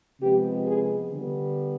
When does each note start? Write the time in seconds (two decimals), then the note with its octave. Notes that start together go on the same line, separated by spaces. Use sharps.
0.21 C3 F3 G#3 B3 G4
0.67 G#4
1.12 D3 G3 B3